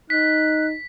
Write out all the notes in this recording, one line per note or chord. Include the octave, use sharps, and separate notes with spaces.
D#4 F#6 B6